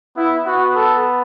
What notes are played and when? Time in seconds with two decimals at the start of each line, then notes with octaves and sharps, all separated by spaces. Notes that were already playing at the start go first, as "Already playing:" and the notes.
0.16 B3 E4
0.45 B3 F#4
0.75 A4